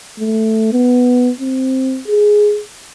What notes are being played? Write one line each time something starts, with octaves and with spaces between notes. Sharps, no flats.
A3
B3
C4
G#4